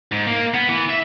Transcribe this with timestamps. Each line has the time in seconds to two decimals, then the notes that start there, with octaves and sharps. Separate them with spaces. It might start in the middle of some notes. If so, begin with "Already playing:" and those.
0.12 G#2
0.27 A#3
0.54 B3
0.69 E3
0.90 E5